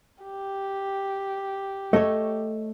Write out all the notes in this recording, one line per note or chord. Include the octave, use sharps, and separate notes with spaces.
G4
A3 A4 C#5 D#5